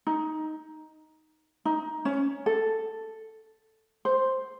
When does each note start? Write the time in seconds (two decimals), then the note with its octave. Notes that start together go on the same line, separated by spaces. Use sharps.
0.07 D#4
1.65 D#4
2.05 C#4
2.46 A4
4.05 C5